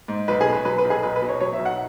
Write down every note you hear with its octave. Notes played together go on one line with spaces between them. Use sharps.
G#2
B1 B4
G#4
B2
B4
F#3 B4
B4
B1
G#4
B1 B4
B4
B2
C#5
F#3 C#5
E5
B1
F#5